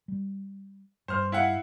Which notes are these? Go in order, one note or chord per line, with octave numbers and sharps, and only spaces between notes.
G3
G2 C5 F6
E4 F5 F#5